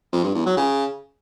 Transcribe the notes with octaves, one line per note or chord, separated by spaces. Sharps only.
F2
G2
E2
F#3
C#3